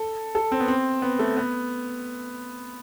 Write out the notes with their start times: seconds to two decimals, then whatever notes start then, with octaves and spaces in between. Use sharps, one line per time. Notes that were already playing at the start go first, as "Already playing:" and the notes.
Already playing: A4
0.35 A4
0.52 C4
0.60 B3
0.68 C4
1.02 B3
1.19 A3
1.37 B3